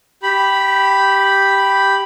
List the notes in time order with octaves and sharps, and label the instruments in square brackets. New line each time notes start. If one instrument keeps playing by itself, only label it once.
[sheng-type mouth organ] G4 B5